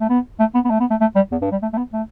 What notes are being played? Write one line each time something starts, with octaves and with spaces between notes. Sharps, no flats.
A3
B3
A3
B3
B3
A3
B3
A3
A3
G3
E2
G2
G3
A3
A3
B3
A3